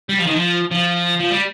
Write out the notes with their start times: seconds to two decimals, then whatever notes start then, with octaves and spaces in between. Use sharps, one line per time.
0.09 G3
0.18 F3
0.27 D#3
0.35 F3
0.71 F3
1.20 F3
1.32 G3